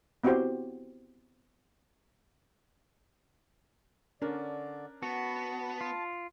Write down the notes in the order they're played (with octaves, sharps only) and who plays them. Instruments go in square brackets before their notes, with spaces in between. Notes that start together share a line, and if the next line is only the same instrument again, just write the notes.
[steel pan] B3 C4 E4 F#4 G4 C5
[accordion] D3 D5 [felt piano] C#4 D4 A#4
[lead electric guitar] B3 [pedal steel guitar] F#4 [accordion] A5
[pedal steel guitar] F4